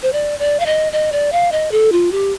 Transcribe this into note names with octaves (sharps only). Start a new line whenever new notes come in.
C5
D5
D5
F5
D#5
D#5
D5
F5
D#5
A4
F4
G4